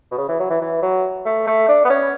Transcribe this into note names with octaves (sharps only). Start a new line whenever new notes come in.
B2
C#3
E3
F#3
E3
E3
F#3
A3
A3
D4
B3
C#4